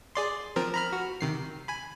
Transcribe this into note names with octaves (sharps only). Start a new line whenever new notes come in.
G#4 D5 C6
F3 C4 A#4
A#5 B5 F6
F#4
C3 D#3 C7
G#5 B5